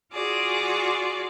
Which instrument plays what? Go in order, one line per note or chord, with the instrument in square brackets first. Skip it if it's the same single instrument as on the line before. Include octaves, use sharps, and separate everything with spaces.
[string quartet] F4 F#4 G#4 D5